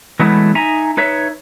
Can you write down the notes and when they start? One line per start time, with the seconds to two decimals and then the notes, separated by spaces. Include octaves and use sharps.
0.19 E3 F#3 G#3 A3 B3 E4
0.55 D#4 E5 G#5 A#5
0.97 D#4 B4 C#5 E5